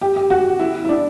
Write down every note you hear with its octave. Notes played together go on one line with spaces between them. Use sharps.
G4
G4
F#4
E4
E4
D4